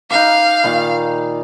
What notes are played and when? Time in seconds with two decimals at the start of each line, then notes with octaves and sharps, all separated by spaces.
0.10 D#4 B4 F5 D6
0.64 A#2 D#3 B5